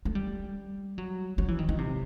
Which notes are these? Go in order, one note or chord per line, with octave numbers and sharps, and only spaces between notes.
A3
G3
F#3
F#3
E3
D#3
D#3
C3